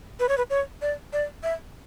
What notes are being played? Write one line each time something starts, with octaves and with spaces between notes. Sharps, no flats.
B4
C#5
B4
C#5
D5
D5
E5